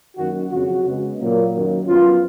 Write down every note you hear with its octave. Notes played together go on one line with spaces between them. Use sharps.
F#2 D#3 A#3 F#4
F2 C#3 F#3 F#4
C#3 G#3 B3
A#2 F#3 A#3
F#2 D#3 F#3 A#3
F#2 F3 B3 F4